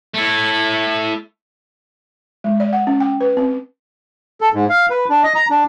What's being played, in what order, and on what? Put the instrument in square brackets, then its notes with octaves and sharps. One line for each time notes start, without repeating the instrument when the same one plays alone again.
[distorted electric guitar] A3 E4
[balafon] G#3
D5
F#5
C#4
G5
B4
C4
[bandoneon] A4
G#2
F5
B4
D4
D#5
A#5
D4